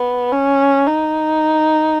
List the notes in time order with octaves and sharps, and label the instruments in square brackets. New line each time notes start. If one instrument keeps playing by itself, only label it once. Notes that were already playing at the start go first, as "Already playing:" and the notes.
Already playing: [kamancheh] B3
C#4
D#4